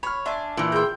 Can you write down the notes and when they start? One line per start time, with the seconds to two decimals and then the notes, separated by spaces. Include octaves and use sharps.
0.03 C#5 B5 F6
0.26 D4 E5 G#5 C6
0.57 A#2 E3
0.72 G#4 G5 A#5 C6 E6 G6